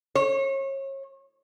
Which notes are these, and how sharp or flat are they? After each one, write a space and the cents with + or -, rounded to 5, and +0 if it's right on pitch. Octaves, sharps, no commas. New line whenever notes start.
C#5 -35